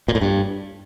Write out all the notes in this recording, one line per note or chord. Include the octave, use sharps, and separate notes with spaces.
A#2
A2
G2